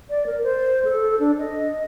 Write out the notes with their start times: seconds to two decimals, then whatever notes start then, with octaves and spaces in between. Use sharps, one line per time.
0.10 D5
0.26 A#4
0.43 C5
0.85 A4
1.19 D4
1.39 D#5